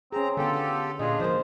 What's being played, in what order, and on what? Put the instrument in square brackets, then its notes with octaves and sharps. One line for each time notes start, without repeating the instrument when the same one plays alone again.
[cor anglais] C4 [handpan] C#4 G#4 [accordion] A#5
[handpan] D3 [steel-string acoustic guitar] B3 G5 [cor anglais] F4 [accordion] G4 A4
[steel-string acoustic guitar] A#2 [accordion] D4 G#4 [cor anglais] F4 [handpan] D#5
[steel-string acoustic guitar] F3 A#3 [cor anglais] C5